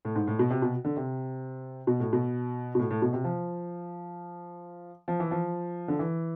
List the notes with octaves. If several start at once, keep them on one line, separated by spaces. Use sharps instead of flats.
A2
G#2
A2
B2
C3
B2
D3
C3
B2
A2
B2
B2
A2
A2
B2
C3
F3
F3
E3
F3
D3
E3